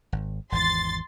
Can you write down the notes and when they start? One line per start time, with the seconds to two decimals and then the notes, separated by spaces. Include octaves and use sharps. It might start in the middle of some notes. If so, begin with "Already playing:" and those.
0.12 G#1
0.52 G#1 E2 E3 C6 A6